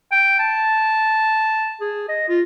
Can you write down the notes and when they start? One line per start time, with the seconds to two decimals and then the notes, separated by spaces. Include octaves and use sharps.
0.11 G5
0.39 A5
1.81 G#4
2.09 D#5
2.29 F4